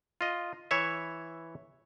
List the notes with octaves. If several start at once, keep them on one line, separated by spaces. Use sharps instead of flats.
F4 D#5
E3 C#5 E5